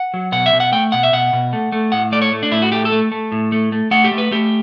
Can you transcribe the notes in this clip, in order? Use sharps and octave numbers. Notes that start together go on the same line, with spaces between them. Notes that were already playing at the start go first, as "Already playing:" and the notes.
Already playing: F#5
F#3
B2 F#5
E5
B2
F#5
A3 G5
B2 F#5
E5
B2 F#5
B2
A3
A3
A2 F#5
A3 D5
C#5
A3
D4
A2 E4
F#4
A3 G4
A4
A3
A3
A2
A3
A3
A3 F#5
G4
A3
B4
A3 G4